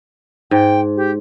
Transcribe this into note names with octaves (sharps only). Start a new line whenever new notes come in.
G#2 G5
G4